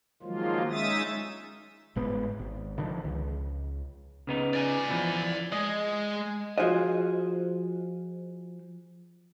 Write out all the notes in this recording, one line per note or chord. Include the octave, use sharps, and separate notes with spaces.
D#3 F3 F#3 G#3 A#3 F4
G#3 C#4 D#4 E5 D#6 A6
G1 G#2 B3
G#1
D3 D#3 F3
C#2
C#3 B3 D#4
D5 G#5
E2 E3 F3
G#3 D#5
F3 F4 F#4 G#4 C5 D#5